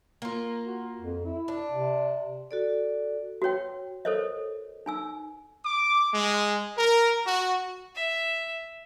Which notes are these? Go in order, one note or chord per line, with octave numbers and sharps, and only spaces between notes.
A#3 F4
F#4
F2
E4
D4
C3
F#4 A4 D5
F#4 B4 C#5 G5
A4 A#4 C5 C#5 D#5
D#4 G#5 E6
D6
G#3
A#4
F#4
E5